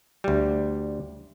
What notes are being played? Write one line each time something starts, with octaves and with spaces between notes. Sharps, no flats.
D2 G3